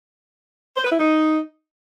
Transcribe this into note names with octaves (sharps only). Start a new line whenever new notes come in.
C5
B4
E4
D#4